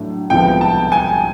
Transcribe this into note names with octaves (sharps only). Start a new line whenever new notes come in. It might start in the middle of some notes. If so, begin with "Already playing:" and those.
Already playing: A2 F#3 D4
C2 C3 F3 G#3 B3 G5
A5
G#5